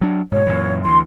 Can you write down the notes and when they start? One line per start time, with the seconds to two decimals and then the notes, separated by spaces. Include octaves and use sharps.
0.01 F#3 D4
0.32 G#2 B2 C#5
0.46 F#2 A#2 E3
0.85 D2 E3 C6